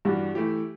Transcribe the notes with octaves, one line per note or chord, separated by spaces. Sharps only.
G2 E3 G3 D4 F#4
E3 A3 E4 G4